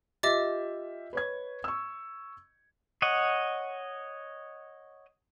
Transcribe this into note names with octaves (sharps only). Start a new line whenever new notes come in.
F4 G4 D#5 E5 D6 A6
B4 C#5 G#6
C#6 E6
C#5 D#5 F#5